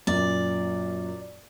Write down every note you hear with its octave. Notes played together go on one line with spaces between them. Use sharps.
F#2 A#2 A#3 D5